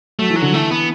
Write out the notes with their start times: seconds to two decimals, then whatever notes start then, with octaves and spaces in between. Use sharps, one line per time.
0.19 F#3 A3
0.30 E3
0.36 F#3
0.42 D3
0.52 E3 A3
0.71 B3